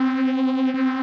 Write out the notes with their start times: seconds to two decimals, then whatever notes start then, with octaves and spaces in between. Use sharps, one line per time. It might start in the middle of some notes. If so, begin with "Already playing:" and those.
Already playing: C4
0.74 C4